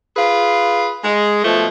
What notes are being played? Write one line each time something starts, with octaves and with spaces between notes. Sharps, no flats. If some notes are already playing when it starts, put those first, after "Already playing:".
F4 G#4 B4
G#3
B2 F3 A3